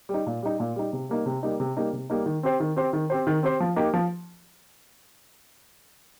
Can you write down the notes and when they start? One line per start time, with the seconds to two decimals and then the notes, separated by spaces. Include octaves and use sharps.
0.09 G3
0.14 D#4
0.27 A#2
0.43 G3 D#4
0.60 A#2
0.76 G3 D#4
0.93 C3
1.09 G3 A#3 D#4
1.26 C3
1.43 G3 A#3 D#4
1.60 C3
1.77 G3 A#3 D#4
1.93 C3
2.10 G3 A#3 D#4
2.26 D#3
2.43 C4 G4 C5
2.60 D#3
2.76 C4 G4 C5
2.93 D#3
3.10 C4 G4 C5
3.27 D#3
3.43 C4 G4 C5
3.60 F3
3.76 A#3 D#4 G4
3.94 F3